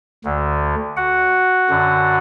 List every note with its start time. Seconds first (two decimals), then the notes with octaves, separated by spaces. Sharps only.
0.24 D2 D3
0.97 F#4 F#5
1.69 F#2 D3